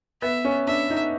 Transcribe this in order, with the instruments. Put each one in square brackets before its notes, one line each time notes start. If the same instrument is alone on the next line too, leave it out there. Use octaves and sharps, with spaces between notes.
[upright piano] B3 [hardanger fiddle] E5
[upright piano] C#4
[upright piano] D4 [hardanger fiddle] E5
[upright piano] D#4